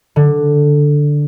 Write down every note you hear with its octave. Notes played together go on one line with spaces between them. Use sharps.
D3